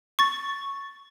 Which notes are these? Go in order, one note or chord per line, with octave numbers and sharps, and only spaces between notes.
C#6 A6